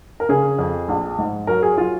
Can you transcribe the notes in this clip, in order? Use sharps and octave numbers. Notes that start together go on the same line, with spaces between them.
A#4
C#3 G#4
F2
A#1
G#2
F#3 A#4
G#4
F#3 F4